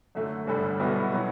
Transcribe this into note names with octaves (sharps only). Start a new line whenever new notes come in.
F#2 D3 A3
G1 G2 D3 G3
B1 B2 G3 B3 E4
B2 F#3